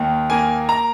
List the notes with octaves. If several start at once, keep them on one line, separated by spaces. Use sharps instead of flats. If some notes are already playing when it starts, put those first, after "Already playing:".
Already playing: D#2 D#3
A#3 G#5
A#5